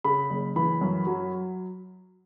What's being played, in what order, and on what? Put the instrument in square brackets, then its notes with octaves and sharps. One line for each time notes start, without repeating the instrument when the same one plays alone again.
[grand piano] C#3 B5
F#1
E3 B5
F#2
F#3